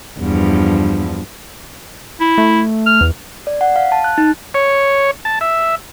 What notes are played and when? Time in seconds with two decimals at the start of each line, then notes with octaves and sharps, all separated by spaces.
0.20 E2 G2 F3
2.21 E4
2.38 A3
2.86 F6
3.01 E2
3.47 D5
3.61 F#5
3.76 F5
3.92 A5
4.04 F#6
4.18 D#4
4.54 C#5
5.25 A5
5.41 E5